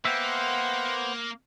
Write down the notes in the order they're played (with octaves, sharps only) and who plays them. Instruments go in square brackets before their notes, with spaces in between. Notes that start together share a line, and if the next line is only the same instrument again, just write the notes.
[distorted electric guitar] A#3 [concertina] B3 C5 [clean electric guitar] E5 G5 [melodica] F#5 C6